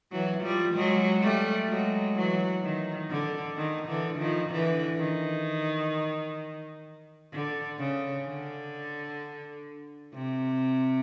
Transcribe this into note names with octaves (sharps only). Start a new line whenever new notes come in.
E3 F#3
F3 G3
F#3 G#3
G3 A3
F#3 G#3
E3 F#3
D#3
D3
D#3
D3 E3
D#3 F3
D3 E3
D#3
D3
C#3
D3
C3